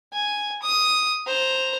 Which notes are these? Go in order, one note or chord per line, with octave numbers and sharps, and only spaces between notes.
G#5
D#6
C5 A#5